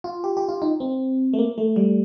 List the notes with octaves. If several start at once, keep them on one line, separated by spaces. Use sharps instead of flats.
F4
G4
G4
F4
D#4
C4
A3
A#3
A3
G3